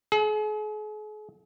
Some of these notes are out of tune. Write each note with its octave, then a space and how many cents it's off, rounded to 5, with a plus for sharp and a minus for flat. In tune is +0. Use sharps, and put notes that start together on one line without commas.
G#4 +40